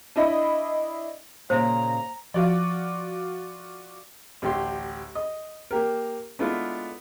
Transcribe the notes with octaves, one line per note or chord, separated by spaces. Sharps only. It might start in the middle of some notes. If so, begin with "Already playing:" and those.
D4 E4 D#5 B5
A#2 C#3 C5 A#5
F3 F4 F#4 D5
A1 D2 G4 C6
D#5
A#3 G4 A#4
G#3 A3 B3 D4 E4 F4